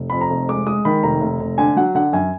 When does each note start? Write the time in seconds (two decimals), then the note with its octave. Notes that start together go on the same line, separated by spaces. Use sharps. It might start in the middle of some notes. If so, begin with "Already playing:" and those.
Already playing: F1
0.10 F2 B5
0.21 A#5
0.30 F1
0.49 G#3 D6
0.67 G#3 D#6
0.85 D#3 B5
1.03 F1 A#5
1.21 F1
1.40 F1
1.58 D3 G#5
1.77 F#3 F#5
1.95 D3 F#5
2.13 F#2 G#5